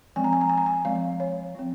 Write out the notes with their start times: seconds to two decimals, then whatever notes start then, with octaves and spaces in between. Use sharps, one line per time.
0.16 F3 G#3 C4 G#5
0.24 A#5
0.33 G#5
0.41 A#5
0.49 G#5
0.58 A#5
0.66 G#5
0.85 F3 G#3 C4 F5
1.20 C#5
1.55 F3 C4